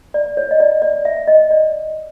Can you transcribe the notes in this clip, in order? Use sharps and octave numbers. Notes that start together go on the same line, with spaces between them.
D5
C#5
D#5
D5
D5
E5
D#5
D5